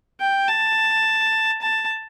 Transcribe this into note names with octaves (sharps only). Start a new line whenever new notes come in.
G5
A5
A5